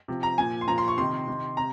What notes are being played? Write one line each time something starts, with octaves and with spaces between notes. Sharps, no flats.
C3 F3
A#5
A#2 F3 G#5
C6
A#2 F3 A#5
C6
C#6
C3 D#3 C6
C3 D#3
C3 A#5